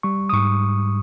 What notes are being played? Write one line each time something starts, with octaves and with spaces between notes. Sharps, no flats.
G3 C#6
D#6
G#2 C#6